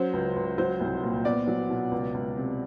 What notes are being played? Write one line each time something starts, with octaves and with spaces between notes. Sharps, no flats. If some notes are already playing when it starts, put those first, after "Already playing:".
Already playing: F#3 C#4 C5
C#2
C#2
F#3 C5
C2
A#2
B3 D5
F#3
B2
C#2
C#2
C3